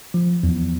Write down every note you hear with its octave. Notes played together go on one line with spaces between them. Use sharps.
F3
E2